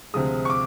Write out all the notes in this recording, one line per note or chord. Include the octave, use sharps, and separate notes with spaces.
D2 C3 F3 G#3 D#6
C#6
D6